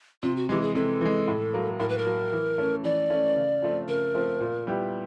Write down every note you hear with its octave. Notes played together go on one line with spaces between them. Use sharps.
C3 F4
F#4
E3 G#3 G4
G#4
C3 A4
E3 G#3
A2
F#3 A#3
A2 A#4
B4
A#4
F#3 A#3
E3
A3 C#4
E3 D5
A3 C#4
C#3
F3 A3 C4
C#3 A#4
F3 A3 C4
A#2
G3 B3 E4 G4